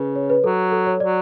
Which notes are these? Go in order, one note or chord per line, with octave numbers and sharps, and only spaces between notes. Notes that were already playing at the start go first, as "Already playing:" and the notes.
Already playing: C#3 B4
C#5
B4
F#3 A4
A4
C#5
F#3 D5